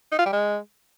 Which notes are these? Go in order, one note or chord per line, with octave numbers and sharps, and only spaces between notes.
D#4
F4
G3
G#3